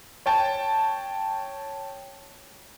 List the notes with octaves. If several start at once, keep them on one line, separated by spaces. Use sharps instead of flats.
C#5 G5 A5